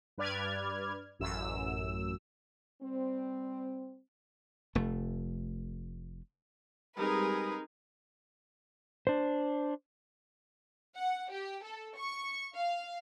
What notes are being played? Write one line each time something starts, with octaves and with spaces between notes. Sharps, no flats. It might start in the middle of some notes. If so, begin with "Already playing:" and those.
G2 B4 D5 F6 G#6
A1 F#2 E6
G3 C4
F1 A3
G3 G#3 C4 D#4 G4 G#4 A#4 B4
D4 C5
F#5
G4
A4
C#6
F5